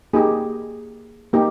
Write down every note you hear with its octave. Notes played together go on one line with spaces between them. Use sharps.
A#3 D#4 G4 G#4
A#3 D#4 G4